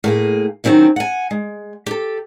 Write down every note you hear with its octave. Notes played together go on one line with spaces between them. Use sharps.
A2 A#3 G#4
D#3 F#3 C4 C#4 E4
F#5 G#5
G#3
G4 A4